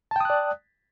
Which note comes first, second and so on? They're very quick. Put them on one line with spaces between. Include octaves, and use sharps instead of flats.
A5 G5 D#6 F#6 D5